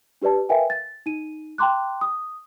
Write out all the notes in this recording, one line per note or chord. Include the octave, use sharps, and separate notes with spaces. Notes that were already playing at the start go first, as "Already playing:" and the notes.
D4 G4 B4 D5 A5
A#4 B4 E5 F5 G5 G#5
A6
D#4 D#7
G5 A#5 C6 D6 F#6
D#6